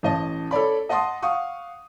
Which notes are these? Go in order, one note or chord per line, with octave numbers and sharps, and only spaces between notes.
A1 D#5 A5
A4 C#5 D5 B5
D#5 F#5 A5 C6 D#6
F5 F#5 C#6 D#6